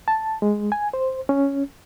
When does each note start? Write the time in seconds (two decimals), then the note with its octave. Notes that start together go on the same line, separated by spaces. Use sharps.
0.08 A5
0.42 G#3
0.72 G#5
0.94 C5
1.29 C#4